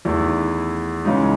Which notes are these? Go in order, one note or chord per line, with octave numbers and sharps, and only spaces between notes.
E2 D#3 A3 E4
C#2 C#3 E3 G#3 D#4